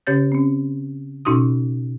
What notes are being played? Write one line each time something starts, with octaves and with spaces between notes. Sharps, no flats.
C#3 C#4 G4 C#5 G6 A6
C4 C#4
B2 C#4 D#4 F#4 C6 D#6